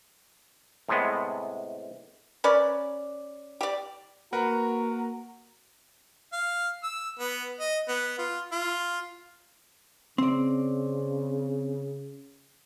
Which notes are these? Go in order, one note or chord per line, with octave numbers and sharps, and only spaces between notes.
A2 C3 G#3 B3
C#4 A#4 B4 D5
G4 D5
A#3 F#4 A#4 B4 F#5 A#5
F5
E6
B3
D#5
B3
F4
F4
C#3 C4 D5